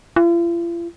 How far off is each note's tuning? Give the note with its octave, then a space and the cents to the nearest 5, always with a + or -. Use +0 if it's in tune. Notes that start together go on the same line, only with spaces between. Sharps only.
F4 -45